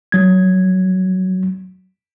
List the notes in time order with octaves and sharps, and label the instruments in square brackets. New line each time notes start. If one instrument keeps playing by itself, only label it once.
[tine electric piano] F#3 G#6